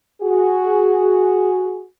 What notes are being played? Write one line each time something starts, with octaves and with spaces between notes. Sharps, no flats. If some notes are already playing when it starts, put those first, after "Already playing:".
F#4 G#4